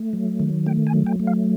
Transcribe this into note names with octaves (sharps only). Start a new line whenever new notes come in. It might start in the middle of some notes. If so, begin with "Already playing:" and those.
Already playing: A3
F#3
D#3
A3 G5
G#5
F#3
G5
A3
F5